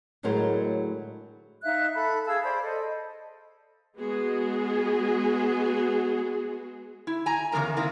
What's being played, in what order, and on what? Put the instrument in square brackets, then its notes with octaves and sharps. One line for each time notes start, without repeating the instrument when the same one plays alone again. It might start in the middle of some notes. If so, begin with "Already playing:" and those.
[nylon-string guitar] D2 A2 F#3 G#3 A#4 C5
[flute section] D#4 E5 F5 F#6
A4 B5
G#4 F5 A5 E6
C5 D5 B5
A4 D#5
[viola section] G#3 B3 F#4 G#4
[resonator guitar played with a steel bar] E4
G#5 A#5
E2 C#3 G3 A#4 A#5
D#3 A#3 C4 E4